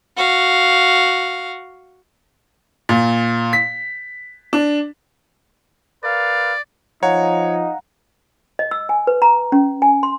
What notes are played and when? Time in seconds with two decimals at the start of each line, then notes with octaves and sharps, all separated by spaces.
0.17 F#4 F5
2.89 A#2
3.53 B6
4.53 D4
6.04 A#4 B4 D5 F5
7.03 F3 D#4 C#5 F5 F#5 A#5
8.59 D#5
8.71 E6
8.89 G#5
9.07 B4
9.22 A#5
9.52 C#4
9.82 G#5
10.03 C6